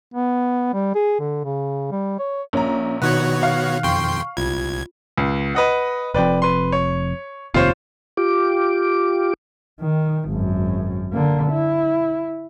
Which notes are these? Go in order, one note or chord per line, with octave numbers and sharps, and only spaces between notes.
B3
G3
G#4
D3
C#3
G3
C#5
A#1 A#3 C#4 C#5 A#5
B2 D#3 B3 D#4 F#4 C#5 F#6
F5
F2 G5 C6 C#6
C2 F4 G#6
C#2
B4 D#5 F#5
F1 F2 B4 D5 G5
B4 C6
C#5
F1 D#2 C3 F4 C5 C#5
F4 G4 D6
D#3
G#1 F#2
D3 A#3
E4